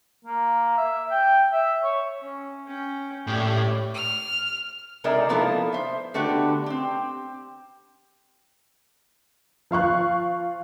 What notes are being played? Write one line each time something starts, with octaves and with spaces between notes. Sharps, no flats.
A#3
E5
G5
E5
C#5
C#4
C#4 G5
A2 G4 D5
F6
C3 G#3 D#4 A#4 D5 E5
F3 A#3 B3 D#4 E4 A4
C5 E5
D3 A3 B3 F#4 G4
C4 G4
F3 F5 C#6 F#6